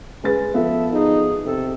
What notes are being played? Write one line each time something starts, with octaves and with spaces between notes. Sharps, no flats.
G#3 C#4 B4 A6
F3 B3 F4 A4 E5
D#4 G#4
C3 A4